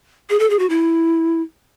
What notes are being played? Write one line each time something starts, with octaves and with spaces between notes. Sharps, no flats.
G#4
A4
G#4
F#4
E4